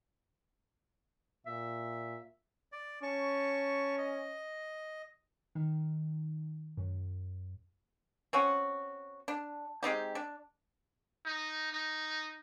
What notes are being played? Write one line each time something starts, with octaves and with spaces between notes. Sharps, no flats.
A#2 E5
D5
C#4 A5 C#6
D#5
D#3
F#2
C4 C#4 F#4
D4
G#3 C4 D#4 G4
D4
D#4
D#4